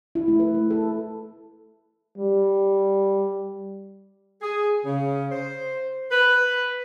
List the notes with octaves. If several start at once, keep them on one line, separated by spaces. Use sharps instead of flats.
E4
A3
B4
A3
A4
G3
G#4
C#3
C5
B4